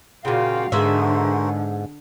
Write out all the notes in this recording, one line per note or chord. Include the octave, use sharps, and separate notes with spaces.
A#2 C#3 F4 F#4 F5 G5
G#2 D3 G#3 B3 F#4 A#4 C5 E5